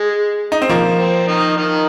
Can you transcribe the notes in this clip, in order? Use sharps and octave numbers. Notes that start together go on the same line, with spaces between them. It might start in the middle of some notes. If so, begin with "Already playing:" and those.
Already playing: G#3
D#4
C4
F3 A#3
C4
D#3 D#4
D#3 D#4